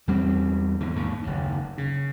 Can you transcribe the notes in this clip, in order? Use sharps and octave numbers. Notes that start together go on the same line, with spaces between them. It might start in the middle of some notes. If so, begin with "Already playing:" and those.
E2 G3 A#3 C4
E2 G#2 D3
D#2 G#2
F#1 D#2
C#3